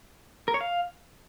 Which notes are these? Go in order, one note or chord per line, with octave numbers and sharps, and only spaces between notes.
A#4
C#5
F5